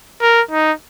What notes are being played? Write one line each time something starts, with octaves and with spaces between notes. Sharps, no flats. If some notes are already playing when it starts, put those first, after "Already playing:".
A#4
D#4